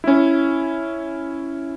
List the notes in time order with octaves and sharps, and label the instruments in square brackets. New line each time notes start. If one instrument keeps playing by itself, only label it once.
[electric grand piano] C#4 E4